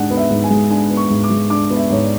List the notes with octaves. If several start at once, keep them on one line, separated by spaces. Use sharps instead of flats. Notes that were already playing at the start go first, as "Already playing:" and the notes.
Already playing: G#2 G#3 D4 F#5
B3
E5
G#2
G#5
G#3
D4 G#5
B3
C#6
G#2
D6
G#3
D4 D6
B3
E5
G#2 C#5
D5